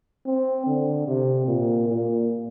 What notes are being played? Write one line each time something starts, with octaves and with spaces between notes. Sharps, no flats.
C4
D3
C3
A#2
A#2